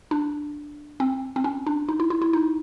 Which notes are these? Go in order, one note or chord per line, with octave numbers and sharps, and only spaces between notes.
D4
C4
C4
C#4
D4
D#4
E4
E4
E4
D#4